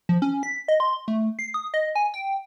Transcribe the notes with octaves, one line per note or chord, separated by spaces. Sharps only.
F3
C#4
B6
D#5
C6
A3
C7
D#6
D#5
G#5
G5